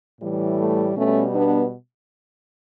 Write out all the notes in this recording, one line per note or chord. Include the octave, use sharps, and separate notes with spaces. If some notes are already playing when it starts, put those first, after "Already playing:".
A2 E3 G3
A3
B2 G3 A3 C#4
B3 D4